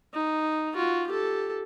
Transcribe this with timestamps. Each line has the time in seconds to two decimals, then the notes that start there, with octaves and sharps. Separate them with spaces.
0.13 D#4
0.74 F4 F#4
1.07 G4 A4